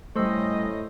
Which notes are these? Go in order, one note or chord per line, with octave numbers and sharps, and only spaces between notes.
A2 G3 A3 C#4 C5 D#5 C6 E6